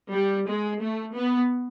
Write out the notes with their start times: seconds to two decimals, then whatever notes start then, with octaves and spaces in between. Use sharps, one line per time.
0.13 G3
0.47 G#3
0.80 A3
1.15 B3